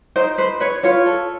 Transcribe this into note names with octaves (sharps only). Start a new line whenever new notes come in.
D#4 C5
B4 C5
B4 C#5
F4 C#5
A4